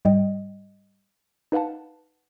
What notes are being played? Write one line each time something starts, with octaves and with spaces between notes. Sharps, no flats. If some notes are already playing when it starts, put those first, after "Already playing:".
G#2 G3 D#5 G5
D#4 B4 F5 F#5 A5